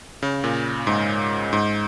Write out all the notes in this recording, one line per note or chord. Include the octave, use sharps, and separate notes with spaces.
C#3
A#2
G#2
G#2